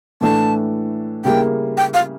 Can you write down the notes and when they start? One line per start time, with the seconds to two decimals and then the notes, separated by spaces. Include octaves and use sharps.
0.21 A2 E3 A3 D4 A4 A5
1.25 C#3 G3 A#3 E4 A#4 G5
1.77 G5
1.94 F5